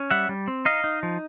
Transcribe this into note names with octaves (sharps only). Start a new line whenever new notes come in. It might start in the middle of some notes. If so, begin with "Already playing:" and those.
Already playing: C#4
G3 E5 F#5
G3
C4
D#4 D#5 F5
D#4
F3